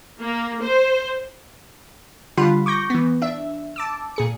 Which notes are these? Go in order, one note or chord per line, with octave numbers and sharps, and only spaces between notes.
A#3
C5
D3 G3 F4 F#5 B5 C6
C#6 D6 G6 A#6
E3 B3
D4 E5
A5 D6 E6
A#2 G#4 C#7